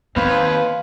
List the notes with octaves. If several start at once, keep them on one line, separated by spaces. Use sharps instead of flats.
D#2 C4 B4 C5 F5